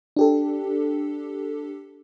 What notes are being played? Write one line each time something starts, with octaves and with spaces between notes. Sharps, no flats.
D4 G4 A4